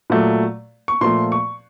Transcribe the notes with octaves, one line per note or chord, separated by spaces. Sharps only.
A#2 F#3 A3
C#6
A#2 F3 A3 C6
C#6